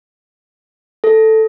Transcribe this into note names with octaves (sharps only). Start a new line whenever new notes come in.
A4